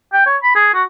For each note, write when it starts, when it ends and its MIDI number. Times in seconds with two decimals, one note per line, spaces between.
0.13 0.24 79
0.26 0.37 73
0.43 0.55 83
0.55 0.70 68
0.74 0.83 66